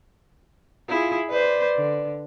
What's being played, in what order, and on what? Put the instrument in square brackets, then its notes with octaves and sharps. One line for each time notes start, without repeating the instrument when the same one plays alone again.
[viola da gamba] E4 G#4 [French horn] F4
[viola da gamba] B4 C5 [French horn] D5
[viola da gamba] D3